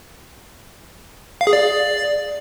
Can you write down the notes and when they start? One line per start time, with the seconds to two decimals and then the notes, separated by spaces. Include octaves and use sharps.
1.41 F5
1.47 G#4
1.53 D5